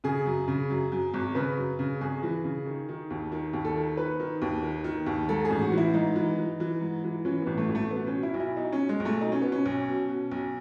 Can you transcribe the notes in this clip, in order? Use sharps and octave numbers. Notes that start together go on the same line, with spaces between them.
C#3 G#4
F#2
C#3
F#2
F#2
G#1
C#3 B4
F#2
C#3
G#1 G#4
E3
C#3
D#3
D#3
D#2
D#3
D#2
A4
D#3
D#3 B4
D#3
D#2
D#3
D#3
D#2
G#2 A4
G#4
A1
F#4
E3
E4
G#2 D#4
E3
E3
E3
G#2
E3
E3 C#4
A1 B3
A3
A1
A3
B2 B3
C#4
B2
E4
B1
E4
B2 D#4
C#4
B2
G#3
B1
A3
B2 D#4
C#4
B2 B3
C#4
B1
B2
B2
B1